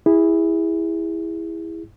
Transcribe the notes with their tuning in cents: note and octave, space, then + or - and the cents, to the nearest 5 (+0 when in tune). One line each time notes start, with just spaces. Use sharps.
E4 +0 G#4 -25